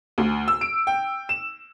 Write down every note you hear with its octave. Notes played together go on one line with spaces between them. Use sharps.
D2
E6
D7
G5
E7